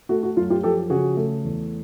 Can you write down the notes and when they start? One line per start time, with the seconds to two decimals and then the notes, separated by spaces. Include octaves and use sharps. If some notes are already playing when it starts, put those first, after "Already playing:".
0.09 A3 F#4
0.23 F#4
0.37 F#2 F4
0.50 F4 G4
0.63 F3 G4 A4
0.90 C#3 F#4 G#4
1.17 A3
1.44 E2